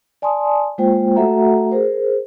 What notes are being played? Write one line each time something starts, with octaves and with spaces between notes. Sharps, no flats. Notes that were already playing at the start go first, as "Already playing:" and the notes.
D5 G#5 A5 C6 D#6
G#3 A#3 F4 C5 G5
A3 F#4 A4 E5 F#5 A#5
G#4 A#4 C5